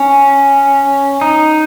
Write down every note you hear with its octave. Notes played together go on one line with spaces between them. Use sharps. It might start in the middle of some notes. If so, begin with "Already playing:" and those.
Already playing: C#4
D#4